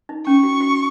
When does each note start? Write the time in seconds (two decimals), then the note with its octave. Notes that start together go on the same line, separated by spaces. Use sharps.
0.09 D#4
0.26 C#4 C#6
0.43 F#4
0.61 F#4